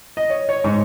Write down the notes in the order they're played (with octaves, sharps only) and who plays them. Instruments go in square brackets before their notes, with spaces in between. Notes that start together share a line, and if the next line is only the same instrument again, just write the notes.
[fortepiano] D#5
C#5
C#5
G#2